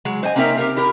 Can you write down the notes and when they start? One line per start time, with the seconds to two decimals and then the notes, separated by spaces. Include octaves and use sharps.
0.05 F#3 G#3
0.23 C5 D#5 G#5
0.36 A#3 C4 C#4 D#4 A#4 E5
0.57 G4 A4 A#4 F5
0.76 E4 G4 A#4